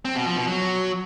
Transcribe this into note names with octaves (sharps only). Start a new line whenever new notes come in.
C4
B2
F3
B2
F#3